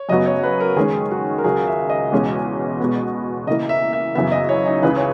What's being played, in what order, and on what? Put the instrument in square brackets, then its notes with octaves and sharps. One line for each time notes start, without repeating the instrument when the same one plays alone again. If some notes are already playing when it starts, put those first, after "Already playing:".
Already playing: [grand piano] C#5
[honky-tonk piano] F#2 C#3 F#3 B3 [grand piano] D#5
[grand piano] C#5
B4
A#4
[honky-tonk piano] D#3 G#3 C#4 [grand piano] G#4
[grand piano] F#4
A#4
[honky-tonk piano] C#2 C#3 F#3 [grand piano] G#4
[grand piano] E5
D#5
[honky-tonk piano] E2 B2 G#3 C#4
B2 G#3 B3
[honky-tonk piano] C#3 E3 A#3 E4 A#4 [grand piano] D#5
[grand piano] E5
E5
[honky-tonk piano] F#2 C#3 E3 B3 [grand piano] E5
[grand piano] D#5
C#5
D#4
[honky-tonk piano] C#2 C#3 E3 [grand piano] B4
[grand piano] C#5